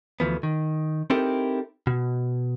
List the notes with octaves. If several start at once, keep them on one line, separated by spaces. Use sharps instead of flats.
D2 E3 F3 B3
D#3
C4 D#4 E4 G4 A4 A#4
B2